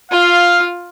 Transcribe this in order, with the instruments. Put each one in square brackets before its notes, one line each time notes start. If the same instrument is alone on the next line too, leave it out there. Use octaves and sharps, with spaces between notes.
[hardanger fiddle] F4 [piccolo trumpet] F5